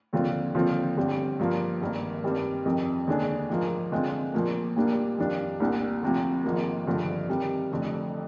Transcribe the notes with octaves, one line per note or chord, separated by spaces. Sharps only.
D#2 D3 F3 C4 F4
D#2 D3 F3 C4 F4
G1 G2 D3 G3 C4
G2 F3 A#3
G#1 G2 D#3 A#3
G2 D#3 G3 C4
F2 C3 D#3
D#2 D3 G#3 D4 G#4
A#1 G#2 F3 A#3
D3 G#3 C4 F4
A#1 A#2 F3 A#3
A#1 A#2 G3 A#3 D4
F2 D#3 G3 D4 F4
C2 A#2 G3 D4
D2 C3 F3
G#1 G#2 F3 A#3
G#1 G2 D3 F3
C3 D#3 G3
F1 F2 D3